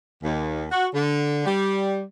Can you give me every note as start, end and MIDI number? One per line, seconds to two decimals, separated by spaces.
0.22 0.64 39
0.70 0.86 66
0.93 1.43 50
1.45 2.01 55